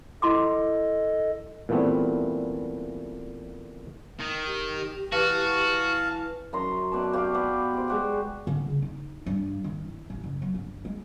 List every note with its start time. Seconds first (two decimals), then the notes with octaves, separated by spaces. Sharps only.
0.22 E4 A4 D#5 C6 D6
1.69 A#2 E3 G3 A3 B3 C4
4.21 D#3
4.47 G4
5.12 E3 F#4 F5 A5
6.53 F#2 A#5 C6
6.92 B2 D5 A5
7.13 G4 C#5 D5 F5
7.35 B3 D5
7.74 G4 C5
7.88 G#3 F#4 G4
8.47 D3
8.66 C#3
8.82 D#4
9.26 G2
9.64 D#3
9.85 E4
10.10 A1
10.23 F#1
10.42 F#3
10.54 G1
10.85 G#3